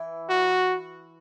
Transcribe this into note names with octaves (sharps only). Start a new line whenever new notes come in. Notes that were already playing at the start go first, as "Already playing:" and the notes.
Already playing: E3
F#4